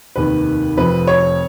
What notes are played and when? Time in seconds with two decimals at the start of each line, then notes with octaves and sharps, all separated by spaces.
0.16 F1 D#2 D#3 B4
0.77 F1 F2 F3 B4
1.07 C#5